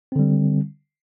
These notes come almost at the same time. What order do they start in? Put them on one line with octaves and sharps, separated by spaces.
C4 D3 G3